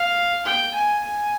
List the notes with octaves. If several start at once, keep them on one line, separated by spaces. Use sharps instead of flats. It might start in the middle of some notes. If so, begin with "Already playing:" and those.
Already playing: F5
G5
G#5
G#5